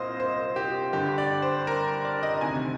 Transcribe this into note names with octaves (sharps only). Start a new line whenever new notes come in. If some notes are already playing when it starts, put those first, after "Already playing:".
Already playing: C2 A#2 C5 D#5 F5
C5
G4
G2 D3 G4
D5
C5
A#4
D5
D#5
D2 C3 D#3 G#5